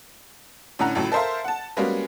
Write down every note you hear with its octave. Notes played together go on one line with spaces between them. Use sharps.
A2 D3 C#4 F#5 A#5
C#2 F#2 A2
A4 A#4 C5 E5 F5
F#5 A5
G3 G#3 A#3 B3 C#4 F#4